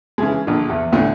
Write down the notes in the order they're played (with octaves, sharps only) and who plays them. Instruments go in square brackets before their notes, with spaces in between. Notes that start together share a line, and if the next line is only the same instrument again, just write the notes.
[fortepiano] C#3 E3 G#3
A#1 D3
E2
D2 A2 D3